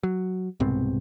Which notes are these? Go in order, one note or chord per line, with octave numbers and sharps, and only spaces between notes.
F#3
C2 G#2 B2 C4